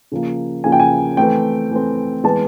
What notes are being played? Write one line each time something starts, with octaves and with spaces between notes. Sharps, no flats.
C#3 F3 A#3
C#3 F3 A#3 G#5
G5
G#5
E3 A3 C4 G5
E3 A3 C4
E3 G#3 B3 A5